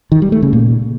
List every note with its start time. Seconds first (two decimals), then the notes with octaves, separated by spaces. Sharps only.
0.12 D#3
0.22 G3
0.32 A3
0.43 C#3
0.53 A#2